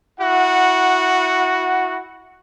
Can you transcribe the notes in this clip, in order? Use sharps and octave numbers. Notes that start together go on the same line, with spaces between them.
E4 F#4 F#5